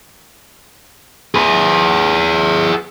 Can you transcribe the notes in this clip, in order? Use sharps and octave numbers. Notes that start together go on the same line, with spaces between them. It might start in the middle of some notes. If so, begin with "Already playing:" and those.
G#4 B4